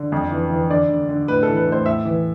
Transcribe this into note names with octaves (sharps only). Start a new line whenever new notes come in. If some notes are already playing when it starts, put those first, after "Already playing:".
Already playing: D3
F2
E3
E3
D3 D5
D3
D3
A2 B4
E3 A4
B4
A2
C5
A2 E5
E3